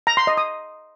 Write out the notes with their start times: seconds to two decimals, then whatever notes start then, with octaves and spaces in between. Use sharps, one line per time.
0.07 A#5
0.17 C6
0.27 D#5
0.37 D#6